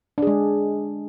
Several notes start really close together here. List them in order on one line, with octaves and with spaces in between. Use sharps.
D4 G#4 G#3